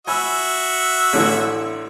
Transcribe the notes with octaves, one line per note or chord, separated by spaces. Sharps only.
F#4 E5 G#5 B5 E6
A1 D3 E3